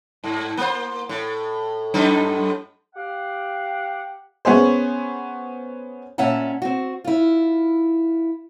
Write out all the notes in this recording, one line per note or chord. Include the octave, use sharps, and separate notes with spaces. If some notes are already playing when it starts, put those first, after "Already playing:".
G#2
A#3 C5
A2
F#2 A2 D#4
G4 F5 F#5
B3 C#4 G#4 C5
A#2 C#4 E5 F#5 A5
C4 F#4
E4 F4